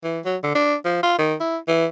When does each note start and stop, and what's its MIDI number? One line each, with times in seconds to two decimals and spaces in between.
0.04 0.20 52
0.25 0.37 54
0.43 0.54 50
0.55 0.75 62
0.85 1.00 53
1.03 1.18 65
1.18 1.35 51
1.40 1.57 64
1.68 1.86 52